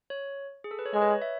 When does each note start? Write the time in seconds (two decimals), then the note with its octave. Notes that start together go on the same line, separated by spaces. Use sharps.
0.10 C#5
0.64 G#4
0.71 A4
0.79 B4
0.86 C#5
0.93 G#3 D#5
1.02 B4
1.11 C#5
1.22 E5